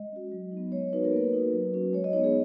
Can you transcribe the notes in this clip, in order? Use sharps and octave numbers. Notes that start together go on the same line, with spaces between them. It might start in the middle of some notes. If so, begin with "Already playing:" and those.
Already playing: G#3 D#5
C#4 F#4
F#3
D#4
B3
G#3 C#5
B3 D#4 F#4 B4
A#4
A#3 B4
D#4 F#4
F#3
C#4 F#4
G#3 C#5
D#5
B3 D#4 C#5
G#4